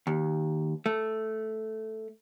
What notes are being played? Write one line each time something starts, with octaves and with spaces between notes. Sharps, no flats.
D#2
A3